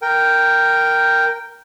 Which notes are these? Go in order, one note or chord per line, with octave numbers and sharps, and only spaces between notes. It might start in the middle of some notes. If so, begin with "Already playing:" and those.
A#4 G5